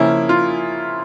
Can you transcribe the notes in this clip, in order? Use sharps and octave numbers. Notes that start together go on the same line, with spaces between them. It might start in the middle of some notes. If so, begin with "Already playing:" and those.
Already playing: C#3 F3 A#3 C#4 E4
F4